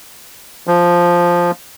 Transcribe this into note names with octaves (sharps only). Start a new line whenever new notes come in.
F3